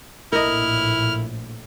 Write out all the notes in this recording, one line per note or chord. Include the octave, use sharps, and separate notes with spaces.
A#1 A2 E4 A#4 D#5 F6